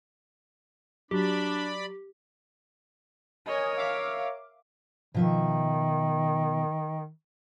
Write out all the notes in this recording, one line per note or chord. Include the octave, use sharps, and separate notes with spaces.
F#3 D4 G4 D5 B5
A#4 C#5 D#5 G#5
E5 F5 D6
B2 D#3 F3 E5